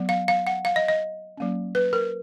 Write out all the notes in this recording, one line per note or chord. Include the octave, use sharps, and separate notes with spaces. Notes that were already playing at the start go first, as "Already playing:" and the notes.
Already playing: F#3 B3
F5
F5
F#5
F5
D#5
D#5
F#3 A#3 C#4
B4
A#4